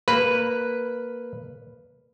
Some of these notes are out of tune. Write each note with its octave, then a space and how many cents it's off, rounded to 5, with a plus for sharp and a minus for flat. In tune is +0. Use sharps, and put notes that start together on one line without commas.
A#3 -5 B4 +0